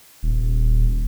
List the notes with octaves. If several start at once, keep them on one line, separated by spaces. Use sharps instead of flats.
D#1